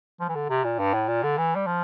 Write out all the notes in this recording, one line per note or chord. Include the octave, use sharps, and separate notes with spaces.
F3
E3
D3
C3
A#2
G2
A2
A#2
D3
E3
G3
F3